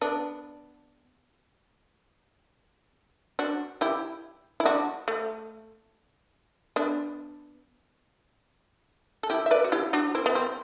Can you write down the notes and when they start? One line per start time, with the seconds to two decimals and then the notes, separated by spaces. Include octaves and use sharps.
0.01 B3 D4
3.39 D4 F#4
3.81 E4 G4
4.60 E4
4.65 D4 F#4
5.08 A3
6.76 B3 D4
9.23 A4
9.30 E4 G4
9.46 E5
9.51 B4 D5
9.64 F#4
9.72 E4 G4
9.93 D4 F#4
10.15 C4 E4
10.26 B3
10.35 C4